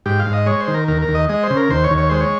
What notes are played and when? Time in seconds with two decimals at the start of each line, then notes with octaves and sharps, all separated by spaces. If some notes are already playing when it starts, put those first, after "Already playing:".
0.06 G#2 G4
0.19 F5
0.26 G#2
0.33 D#5
0.46 G#3 C#5
0.60 C5
0.68 D#3
0.74 A#4
0.88 D#2 A#4
1.02 A#4
1.08 D#2
1.15 D#5
1.29 G#3 D#5
1.43 C5
1.50 C#3
1.57 A#4
1.70 D#2 C5
1.84 C#5
1.91 D#2
1.98 C#5
2.09 G#3 C5
2.21 C#5